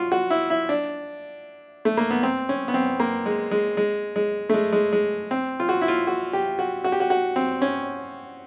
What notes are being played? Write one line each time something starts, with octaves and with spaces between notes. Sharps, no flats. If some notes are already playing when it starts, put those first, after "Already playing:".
Already playing: F4 F#4
F#4
E4
E4
D4
A3
A#3
B3
C4
C#4
B3
C4
A#3
G#3
G#3
G#3
G#3
A3
G#3
G#3
G#3
C4
F4
F#4
E4
F4
F#4
G4
F#4
F#4
G4
F#4
F#4
C4
C#4